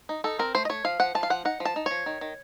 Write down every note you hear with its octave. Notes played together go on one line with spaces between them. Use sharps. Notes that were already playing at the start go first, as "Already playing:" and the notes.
D#4
D#4 A4
C4 A#4
A3 C5
D#5
A3 C#5
F3 F5
F3 F#5
F3 A5
F5
F3 F#5
D#4 F#5
F3
A5
D#4
F3 C#5
D#3
D#3